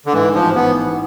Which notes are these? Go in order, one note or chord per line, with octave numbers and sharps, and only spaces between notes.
D3
G#2 E3
A1 F3
E3 B3